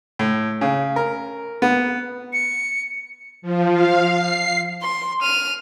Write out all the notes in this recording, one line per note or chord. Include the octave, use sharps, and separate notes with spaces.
A2
C#3
A#4
B3
C#7
F3
F5
C7
C6
F6 D#7